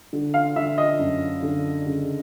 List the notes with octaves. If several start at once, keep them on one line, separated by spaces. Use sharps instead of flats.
D3
F5
D3 E5
D#5
F#2
D3
C#3